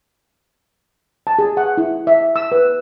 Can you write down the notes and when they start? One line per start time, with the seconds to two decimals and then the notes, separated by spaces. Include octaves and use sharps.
1.27 A5
1.39 G#4
1.57 F#5
1.78 E4
2.07 E5
2.36 E6
2.52 B4